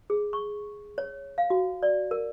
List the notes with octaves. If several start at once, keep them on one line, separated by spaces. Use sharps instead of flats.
G#4
C#6
C#5
F5
F#4
D5
A#4